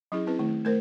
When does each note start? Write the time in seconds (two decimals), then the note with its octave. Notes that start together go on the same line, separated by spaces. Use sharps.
0.12 F#3 C#4 E4 G#4
0.27 C4 E4 G#4 B4
0.39 D#3 A3 E4
0.65 A3 A#4 C5